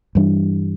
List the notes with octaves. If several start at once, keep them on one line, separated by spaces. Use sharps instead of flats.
G2 E3 G3 D4